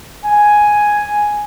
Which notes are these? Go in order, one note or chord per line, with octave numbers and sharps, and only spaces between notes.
G#5